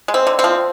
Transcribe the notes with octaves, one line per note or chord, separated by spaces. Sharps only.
G#3
C4
D3
C4
F3